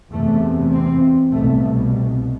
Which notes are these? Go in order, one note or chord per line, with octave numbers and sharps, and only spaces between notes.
E2 C3 A3
C4
C2 B2 A3